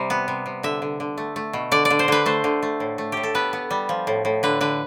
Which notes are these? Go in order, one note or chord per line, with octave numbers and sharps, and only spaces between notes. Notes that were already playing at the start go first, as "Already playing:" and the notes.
Already playing: C3 G3
B3
C3
C3
D3 E5
D3
D3
A3
A3
B2
D3 D5
D5
D3
C5
D3 B4
A3 C5
D3
A3
A2
A3
A2 G4
A4
B3 B4
B3
G3
F3
A2
A2
D3 B4
D3 B4